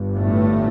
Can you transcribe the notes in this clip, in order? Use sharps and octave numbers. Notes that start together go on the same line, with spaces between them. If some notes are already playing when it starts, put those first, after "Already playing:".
Already playing: G1 G2
A2 A3